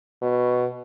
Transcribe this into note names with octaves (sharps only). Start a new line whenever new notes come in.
B2